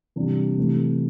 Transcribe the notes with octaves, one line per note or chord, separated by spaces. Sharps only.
C3 E3 G3 D4
C3 E3 A3